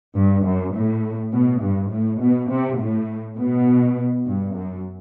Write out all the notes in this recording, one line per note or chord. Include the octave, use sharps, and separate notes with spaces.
G2
F#2
A2
B2
G2
A2
B2
C3
A2
B2
G2
F#2